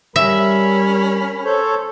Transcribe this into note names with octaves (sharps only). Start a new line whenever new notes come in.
G3 C#4 A#4 E5 B5
A4 C5 C#5